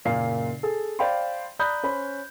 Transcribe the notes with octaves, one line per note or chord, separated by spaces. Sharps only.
F#1 A#2 F5 C7
G#4 A4
C5 D5 F5 G5 B5 C6
D5 A#5 B5 D#6 F#6 G6
C#4 C5 B5